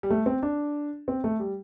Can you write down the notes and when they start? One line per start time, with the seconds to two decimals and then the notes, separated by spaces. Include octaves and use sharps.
0.03 G3
0.10 A3
0.26 C4
0.43 D4
1.08 C4
1.24 A3
1.40 G3